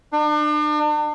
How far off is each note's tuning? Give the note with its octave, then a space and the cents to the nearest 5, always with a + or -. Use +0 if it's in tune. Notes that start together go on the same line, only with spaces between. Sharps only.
D4 +40